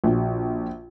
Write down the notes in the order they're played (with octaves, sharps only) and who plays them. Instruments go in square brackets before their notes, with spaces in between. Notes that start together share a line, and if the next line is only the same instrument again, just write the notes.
[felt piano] A#1 F#4